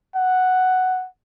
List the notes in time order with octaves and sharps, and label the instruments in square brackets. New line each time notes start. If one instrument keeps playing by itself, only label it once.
[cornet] F#5